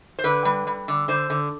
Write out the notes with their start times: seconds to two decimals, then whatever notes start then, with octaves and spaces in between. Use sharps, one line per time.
0.19 C5
0.24 D3 B4
0.45 G3
0.67 G3
0.88 D3
1.08 D3 C5
1.30 D3